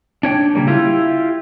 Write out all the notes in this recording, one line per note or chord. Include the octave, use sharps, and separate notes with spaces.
D4 C#5 G5
C#3 G3 A#3
E4 F4 G4